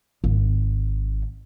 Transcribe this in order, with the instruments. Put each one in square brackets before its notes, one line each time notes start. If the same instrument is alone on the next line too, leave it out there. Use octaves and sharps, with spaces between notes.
[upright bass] G#1